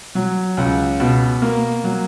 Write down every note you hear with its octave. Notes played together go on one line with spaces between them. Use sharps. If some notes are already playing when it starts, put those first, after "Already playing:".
F#3
C#2
B2
A#3
F#3